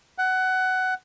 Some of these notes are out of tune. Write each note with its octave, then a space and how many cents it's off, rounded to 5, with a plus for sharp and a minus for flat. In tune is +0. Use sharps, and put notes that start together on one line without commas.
F#5 +15